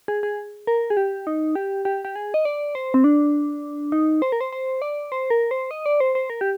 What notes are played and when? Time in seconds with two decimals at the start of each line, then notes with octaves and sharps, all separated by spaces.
0.08 G#4
0.23 G#4
0.67 A#4
0.90 G#4
0.97 G4
1.27 D#4
1.55 G4
1.85 G4
2.05 G4
2.16 G#4
2.34 D#5
2.45 D5
2.75 C5
2.94 C4
3.04 D4
3.92 D#4
4.22 C5
4.32 A#4
4.41 C5
4.53 C5
4.82 D5
5.12 C5
5.30 A#4
5.51 C5
5.71 D#5
5.86 D5
6.00 C5
6.15 C5
6.30 A#4
6.41 G4